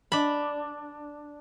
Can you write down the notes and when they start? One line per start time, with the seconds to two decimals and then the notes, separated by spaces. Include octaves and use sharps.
0.12 D4 B5